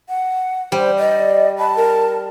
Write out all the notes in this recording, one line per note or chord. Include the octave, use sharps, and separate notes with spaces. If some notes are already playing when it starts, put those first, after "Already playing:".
F#5
G3 C5
D5 D#5
A5 B5
A#4